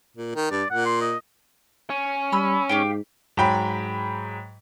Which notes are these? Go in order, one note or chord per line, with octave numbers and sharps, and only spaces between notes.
A#2
D#3
G2 D5
A#2 F#5
C6
D#5
C#4
G3 B5 E6
G#2 G4 F5 G5
G#2 F#3 G5 B5